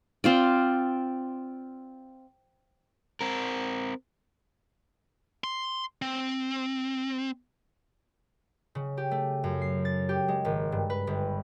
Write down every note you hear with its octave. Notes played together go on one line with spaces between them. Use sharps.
C4 F4 D5
C4 A#4
C6
C4
C#3
G4
A3
F#2
C7
A6
G4
G#3
G#1
G2
B4
G1